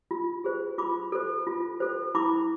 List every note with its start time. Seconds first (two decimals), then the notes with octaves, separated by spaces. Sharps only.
0.11 F4
0.44 G#4 C5
0.78 F4 B5 D6
1.12 A4 C5
1.47 F4
1.80 A4 C5
2.15 E4 B5 D6